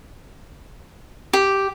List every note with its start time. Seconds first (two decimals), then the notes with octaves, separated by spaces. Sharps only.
1.33 G4